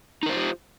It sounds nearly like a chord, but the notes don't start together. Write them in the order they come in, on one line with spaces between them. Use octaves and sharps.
D#4 A#4 C5 F4 G4